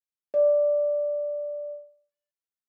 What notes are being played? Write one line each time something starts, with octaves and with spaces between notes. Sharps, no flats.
D5